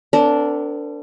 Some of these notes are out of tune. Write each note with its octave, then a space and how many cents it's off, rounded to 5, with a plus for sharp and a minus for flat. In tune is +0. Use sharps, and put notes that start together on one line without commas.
B3 +45 D4 -15 A#4 -45